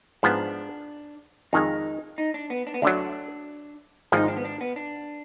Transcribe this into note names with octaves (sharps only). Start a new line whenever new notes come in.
G#2 F3 B3 D4
F2 D#3 G#3 D#4
D#4
D4
B3
D4
B3
D2 D3 F#3 D4
G#1 G#2 F3 D#4
D4
B3
D4
B3
D4